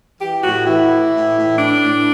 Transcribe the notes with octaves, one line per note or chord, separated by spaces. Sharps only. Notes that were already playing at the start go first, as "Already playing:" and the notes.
E3 G4
A2 F#4
E3 E4
E3
A2
A2
E3 D4
A2